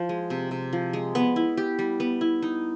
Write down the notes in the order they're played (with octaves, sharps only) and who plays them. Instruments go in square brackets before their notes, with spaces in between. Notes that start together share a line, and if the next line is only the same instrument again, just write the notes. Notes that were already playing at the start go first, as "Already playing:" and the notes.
Already playing: [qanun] F3
G#3
C3
C3
F3
G#3
B3
E4
G4
G3
B3
E4
D#4